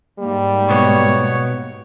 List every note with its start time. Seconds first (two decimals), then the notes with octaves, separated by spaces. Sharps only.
0.19 G#2 G3 A#3
0.70 B2 B3 C#5